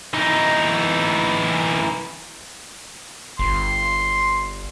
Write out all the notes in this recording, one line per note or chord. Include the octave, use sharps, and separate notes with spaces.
E3 D#4
G1 C6